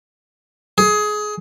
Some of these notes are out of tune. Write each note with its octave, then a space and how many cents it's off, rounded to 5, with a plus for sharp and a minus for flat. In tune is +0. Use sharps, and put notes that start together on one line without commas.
G#4 +20